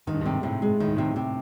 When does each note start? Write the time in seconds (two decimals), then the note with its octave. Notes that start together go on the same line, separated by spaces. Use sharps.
0.07 G#2 D#3
0.14 G2
0.21 G#2 C3
0.43 A2 C3
0.62 G#3
0.80 A2 D#3
0.88 G#2
0.97 A2 C3
1.16 C3